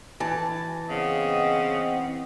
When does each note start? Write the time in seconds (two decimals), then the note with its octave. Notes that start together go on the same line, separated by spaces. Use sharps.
0.20 E3 A5
0.90 C#3 B3 C4 D#5